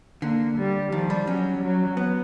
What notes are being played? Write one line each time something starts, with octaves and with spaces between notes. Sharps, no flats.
D3 A#3
G3
D#3 F3
G3
F#3 C#4
F#3
B3